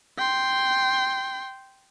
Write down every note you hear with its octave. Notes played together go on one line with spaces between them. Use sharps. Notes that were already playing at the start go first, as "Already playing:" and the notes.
G5 C6